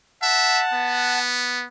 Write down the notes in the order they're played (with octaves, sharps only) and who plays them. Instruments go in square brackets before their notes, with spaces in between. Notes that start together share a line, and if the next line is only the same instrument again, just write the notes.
[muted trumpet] E5 [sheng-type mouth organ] F#5 A5
[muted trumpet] B3